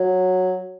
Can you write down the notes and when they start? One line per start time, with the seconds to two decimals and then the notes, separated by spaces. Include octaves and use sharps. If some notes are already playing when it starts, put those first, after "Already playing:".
Already playing: F#3